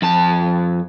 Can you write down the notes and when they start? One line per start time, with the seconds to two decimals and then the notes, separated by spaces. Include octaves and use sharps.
0.02 F2 A5